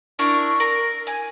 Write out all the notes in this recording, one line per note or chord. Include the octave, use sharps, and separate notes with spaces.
D4 E4 A#4 C#6
A#4
G#5